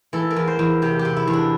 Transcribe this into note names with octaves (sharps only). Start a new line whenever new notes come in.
E3 A4
A#4
E2
C5
E2
C3 G4
G4
C3
E4
E2
D4